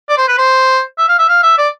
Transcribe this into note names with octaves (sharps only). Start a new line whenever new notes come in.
D5
C5
B4
C5
E5
F5
E5
F5
E5
D5